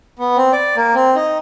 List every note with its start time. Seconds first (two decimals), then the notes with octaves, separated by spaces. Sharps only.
0.19 B3
0.37 C4
0.53 D5
0.76 A#3
0.94 C4
1.16 D#4